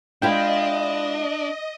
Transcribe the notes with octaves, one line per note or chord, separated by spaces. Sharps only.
G#3 D4 E4 F4 D#5 F5 G5